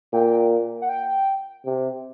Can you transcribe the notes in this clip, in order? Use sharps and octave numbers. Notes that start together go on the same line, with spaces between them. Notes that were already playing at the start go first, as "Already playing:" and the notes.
A#2 G5
F#5
G5
C3